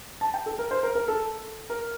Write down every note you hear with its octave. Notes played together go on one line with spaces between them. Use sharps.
A5
G5
A4
A#4
C5
A#4
A#4
A4
A#4